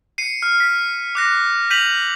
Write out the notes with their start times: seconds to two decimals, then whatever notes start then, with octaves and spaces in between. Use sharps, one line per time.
0.18 C7 C#7 D#7
0.42 F6
0.60 B6
1.15 D6 F#6 A#6 C7
1.70 G6 B6 D#7 F7 F#7